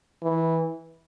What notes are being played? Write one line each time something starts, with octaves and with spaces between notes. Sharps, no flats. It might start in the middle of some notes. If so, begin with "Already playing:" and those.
E3